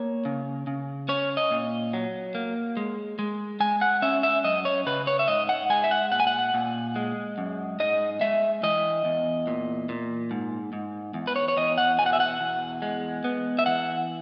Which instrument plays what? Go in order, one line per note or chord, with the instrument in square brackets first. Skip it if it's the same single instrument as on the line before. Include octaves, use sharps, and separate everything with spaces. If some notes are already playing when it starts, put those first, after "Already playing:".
Already playing: [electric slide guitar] A#3 C#5
C#3
C#3
C#4 C#5
D#5
A#2
F#3
A#3
G#3
G#3
G#3 G#5
F#5
C#4 E5
E5
F#2 D#5
C#5
C#3 B4
C#5
E5
G#2 D#5
F#5
G#3 G#5
E5
F#5
A#2 F#5
G#5
F#5
A#2
G#3
F#2
G#2 D#5
G#3 E5
E3 D#5
E2
A#2
A#2
G#2
G#2
E2
B4
C#5
C#5
E2 D#5
F#5
B2 G#5
F#5
E5
F#5
E2
G#3
B3
E5
E3 F#5